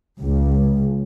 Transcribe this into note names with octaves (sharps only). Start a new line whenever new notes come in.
C#2